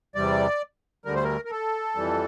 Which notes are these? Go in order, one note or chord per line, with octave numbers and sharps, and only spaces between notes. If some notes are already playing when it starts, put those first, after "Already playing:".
E2 C3 G3 D5
D2 D3 G3 A#4
C5
A#4
A#4
A4
F2 E3 G3